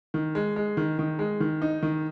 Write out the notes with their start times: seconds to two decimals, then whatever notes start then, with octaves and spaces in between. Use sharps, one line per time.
0.14 D#3
0.35 G#3
0.56 G#3
0.77 D#3
0.99 D#3
1.19 G#3
1.40 D#3
1.62 D#4
1.83 D#3